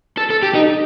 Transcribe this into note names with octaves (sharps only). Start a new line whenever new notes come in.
A4
A4
G4
D#4